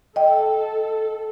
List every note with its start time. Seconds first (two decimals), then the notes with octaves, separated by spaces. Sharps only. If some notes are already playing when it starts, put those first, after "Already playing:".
0.16 A4 D#5 G5